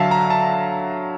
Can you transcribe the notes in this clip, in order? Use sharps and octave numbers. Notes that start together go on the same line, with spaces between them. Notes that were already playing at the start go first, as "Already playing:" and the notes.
Already playing: D3 F#3 E5 F5 A5
A#5
A5